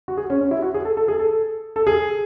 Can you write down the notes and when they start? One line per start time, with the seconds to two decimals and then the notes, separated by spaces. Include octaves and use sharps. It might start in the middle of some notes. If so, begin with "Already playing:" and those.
0.08 F#4
0.17 G#4
0.30 C#4
0.41 C#4
0.51 E4
0.62 F#4
0.74 G#4
0.85 A4
0.97 A4
1.08 G#4
1.19 A4
1.76 A4
1.87 G#4